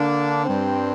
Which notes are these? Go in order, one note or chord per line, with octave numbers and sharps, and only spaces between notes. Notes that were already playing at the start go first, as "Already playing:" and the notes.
Already playing: D3 A#3 D4
G2 G3 C4